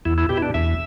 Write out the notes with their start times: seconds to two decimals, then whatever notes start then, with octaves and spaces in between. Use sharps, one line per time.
0.05 E2 E4
0.18 E4
0.29 B2 G4
0.37 E4
0.42 D4
0.54 E2 E5